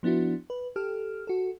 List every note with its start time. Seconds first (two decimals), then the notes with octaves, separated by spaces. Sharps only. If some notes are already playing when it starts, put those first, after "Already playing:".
0.03 F3 B3 D4 E4 F#4
0.50 B4
0.76 G4 A4 F6
1.27 F#4 A4